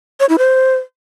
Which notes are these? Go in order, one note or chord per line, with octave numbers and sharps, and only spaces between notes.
C#5
E4
C5